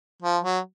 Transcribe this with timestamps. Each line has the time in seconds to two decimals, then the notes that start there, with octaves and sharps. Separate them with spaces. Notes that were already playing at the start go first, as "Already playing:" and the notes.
0.22 F3
0.44 F#3